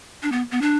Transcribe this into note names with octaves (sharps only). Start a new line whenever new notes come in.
D4
B3
B3
D4